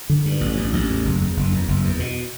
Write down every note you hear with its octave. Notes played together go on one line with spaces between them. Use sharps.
D3
G2
A1
A1
A1
E2
F#1
E2
F#1
E2
F#1
E2
B2